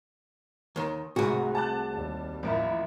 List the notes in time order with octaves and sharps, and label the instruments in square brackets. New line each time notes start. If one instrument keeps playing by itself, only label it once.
[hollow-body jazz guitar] D#2 D#3
[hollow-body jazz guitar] C2 F#4 [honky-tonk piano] G#2 [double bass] C3 A3 [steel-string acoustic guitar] G#4 F#5 G#5
[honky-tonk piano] A5 D6 F#6
[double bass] D#2 G3
[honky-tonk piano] A1 A#4 B5 [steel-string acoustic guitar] F3 A#3 E4